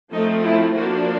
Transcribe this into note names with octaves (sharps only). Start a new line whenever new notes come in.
F3 A3 C4 D#4
E4
F3 A#3 D4 F#4